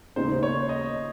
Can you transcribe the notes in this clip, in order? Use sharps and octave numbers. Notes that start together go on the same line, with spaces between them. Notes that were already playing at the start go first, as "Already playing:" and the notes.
D#2 C#3 G#3 D#4 C5
C#5
D#5